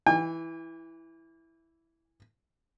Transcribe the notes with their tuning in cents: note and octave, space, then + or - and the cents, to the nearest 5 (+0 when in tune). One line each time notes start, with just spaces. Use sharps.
E3 +0 G#5 -45